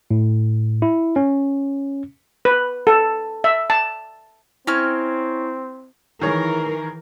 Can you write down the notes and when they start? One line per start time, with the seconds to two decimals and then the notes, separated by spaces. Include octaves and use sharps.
0.11 A2
0.82 E4
1.16 C#4
2.45 B4
2.87 A4
3.44 E5
3.70 A5
4.67 C4 C#4 E4 C#5 F6
6.22 D#3 E3 G#4 A#4 C#5